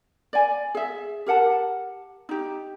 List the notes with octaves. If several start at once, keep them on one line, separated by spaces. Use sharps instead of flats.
D5 G#5
G#4 E5
G4 A#4 F#5 A5
D#4 G4